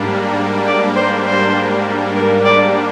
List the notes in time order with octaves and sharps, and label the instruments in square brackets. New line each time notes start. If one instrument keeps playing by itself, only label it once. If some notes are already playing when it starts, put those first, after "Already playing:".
Already playing: [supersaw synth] G#2 G3 A#3 D4
[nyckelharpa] D5
C5
C5
A#4
D5